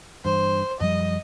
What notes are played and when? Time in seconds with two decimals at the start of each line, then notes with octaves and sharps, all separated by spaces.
0.25 G2 E3 C5
0.81 F#2 F3 G3 D#5